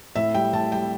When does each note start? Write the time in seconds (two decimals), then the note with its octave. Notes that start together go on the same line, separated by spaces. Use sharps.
0.16 A2 E5
0.34 G3 G5
0.53 A2 A5
0.72 G3 G5